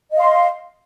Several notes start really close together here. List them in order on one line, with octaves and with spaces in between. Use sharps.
D#5 F5 C6